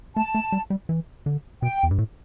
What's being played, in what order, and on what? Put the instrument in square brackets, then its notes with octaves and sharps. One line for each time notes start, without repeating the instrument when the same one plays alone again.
[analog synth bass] A3 [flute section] A5
[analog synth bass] A3
G3
G3
E3
D3
[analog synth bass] B2 [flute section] G5
[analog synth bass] E2
G2
A2